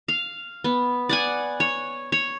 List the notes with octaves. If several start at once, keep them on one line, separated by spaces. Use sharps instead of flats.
F5
B3
D5 F#5 G#5
C#5
C#5